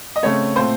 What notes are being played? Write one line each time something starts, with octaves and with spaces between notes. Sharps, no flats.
D#5
C#3 A3 C4 C#5
A#2 A3 C4 C5